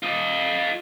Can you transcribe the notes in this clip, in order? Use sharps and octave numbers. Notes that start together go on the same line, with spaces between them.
F4 D#5